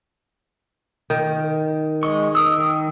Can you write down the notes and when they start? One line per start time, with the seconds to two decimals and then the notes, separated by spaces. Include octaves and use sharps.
1.10 D#3
2.03 G#3 D#5 C#6
2.35 A#4 D#6 E6
2.58 D#3